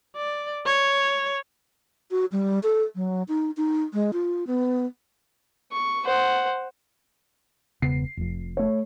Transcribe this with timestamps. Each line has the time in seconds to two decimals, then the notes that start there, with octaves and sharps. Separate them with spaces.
0.17 D5
0.66 C#5
2.11 F#4
2.32 G3
2.63 A4
2.95 F#3
3.28 D#4
3.57 D#4
3.93 G#3
4.13 F4
4.47 B3
5.72 C#6
6.05 C5 F#5
7.82 E1 C#3 B3 C7
8.17 F1 F2
8.57 A3 C#5